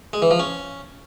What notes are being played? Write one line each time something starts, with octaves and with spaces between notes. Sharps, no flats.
G#3
E3
F3
C#4